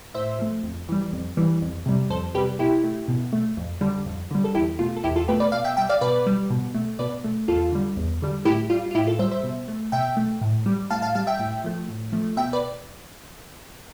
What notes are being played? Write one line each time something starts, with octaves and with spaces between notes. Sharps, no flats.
A2 C5 E5
F3 A3
F2
E3 G3
F2
E3 G3
F2
C3 G3
F2 A4 C5
C3 G3 G4 B4
B2 E4 G4
A3
B2
A3
F2
D3 G3
F2
D3 G3
A4
E2 E4 G4
B2 A3 F4
A4
E2 E4 G4
F4 A4
B2 A3 G4 B4
B4 D5
B2 D5 F5
E5 G5
G3 E5 G5
D5 F5
B2 B4 D5
G3
B2
A3
B2 B4 D5
A3
E2 F4 A4
D3 G3
E2
D3 G3
A2 E4 G4
G3 F4
F4
A2 E4 G4
F4 A4
G3 C5 E5
C5 E5
B2
A3
B2 E5 G5
A3
A2
G3
A2 F5 A5
F5 A5
G3 F5 A5
E5 G5
A2
F3 A3
A2
F3 A3
B2 E5 G5
B4 D5